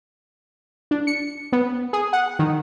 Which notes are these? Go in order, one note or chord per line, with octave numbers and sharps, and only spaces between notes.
D4
C#7
B3
G#4
F#5
D#3